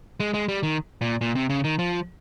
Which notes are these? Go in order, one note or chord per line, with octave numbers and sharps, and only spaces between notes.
G#3
G#3
G3
D#3
A#2
A#2
C3
C#3
D#3
F3